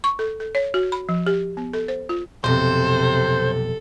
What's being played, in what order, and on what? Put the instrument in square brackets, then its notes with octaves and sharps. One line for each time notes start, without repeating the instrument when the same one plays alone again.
[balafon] C#6
A4
A4
C#5
F#4
B5
F3
G4
B3
A4
C5
F4
[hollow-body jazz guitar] B1 F2 [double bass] C3 [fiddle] A4 [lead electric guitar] C5